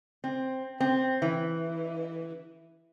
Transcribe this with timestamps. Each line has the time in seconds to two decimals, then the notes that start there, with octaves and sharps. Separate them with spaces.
0.24 C4
0.80 C4
1.22 E3